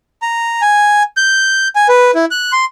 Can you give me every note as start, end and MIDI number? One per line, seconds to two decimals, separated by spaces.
0.22 0.61 82
0.62 1.03 80
1.17 1.68 91
1.75 1.87 80
1.89 2.11 71
2.15 2.25 64
2.31 2.52 90
2.52 2.65 84